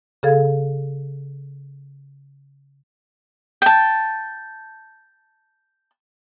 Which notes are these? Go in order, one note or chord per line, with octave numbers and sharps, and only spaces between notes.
C#3 G#4 A4 F5 G#6
G5 A5